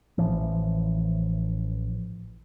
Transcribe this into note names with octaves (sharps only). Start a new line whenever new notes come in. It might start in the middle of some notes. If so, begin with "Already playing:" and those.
A1 E3 F3